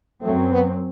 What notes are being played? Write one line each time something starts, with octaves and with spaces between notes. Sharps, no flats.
F#2 F#3 A3 C4
B3